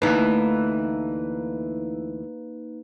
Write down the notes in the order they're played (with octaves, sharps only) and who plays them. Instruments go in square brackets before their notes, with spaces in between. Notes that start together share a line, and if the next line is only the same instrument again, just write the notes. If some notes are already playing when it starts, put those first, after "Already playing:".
[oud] D2 E3 [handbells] A#3 D#4 B4